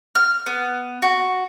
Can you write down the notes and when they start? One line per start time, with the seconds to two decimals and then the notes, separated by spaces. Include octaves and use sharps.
0.15 F6
0.46 B3
1.02 F#4